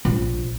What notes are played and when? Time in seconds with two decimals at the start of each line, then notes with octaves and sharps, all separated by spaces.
0.05 A#1